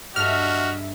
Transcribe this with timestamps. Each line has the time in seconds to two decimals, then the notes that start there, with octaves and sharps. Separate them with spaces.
0.16 G2 F#4 A4 D#5 E5 F6